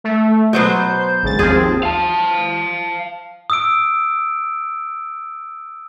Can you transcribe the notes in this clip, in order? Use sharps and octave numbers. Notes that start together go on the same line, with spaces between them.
A3
B2 F#3 B3 C5 G6
G#1 C#3 A6
D#2 F3 C4 G#4 C5
F5 A5
D#6 E6 D7